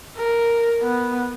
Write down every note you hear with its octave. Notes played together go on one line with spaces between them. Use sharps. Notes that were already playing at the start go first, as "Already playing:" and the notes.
A#4
B3